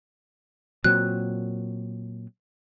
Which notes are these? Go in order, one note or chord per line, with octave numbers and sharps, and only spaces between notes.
A#2 F#3 C4 F#6